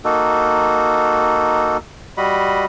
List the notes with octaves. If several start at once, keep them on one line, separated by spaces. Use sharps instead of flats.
A#3 D#4 F#4 A4
G3 F#4 D#5 B5